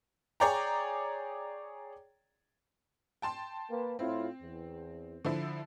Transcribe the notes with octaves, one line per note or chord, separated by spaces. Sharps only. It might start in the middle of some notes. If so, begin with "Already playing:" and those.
G#4 C#5 D5 G5 A#5
G5 A5 C6
A#3 B4
A2 C4 E4 F4
E2
D3 F3 E4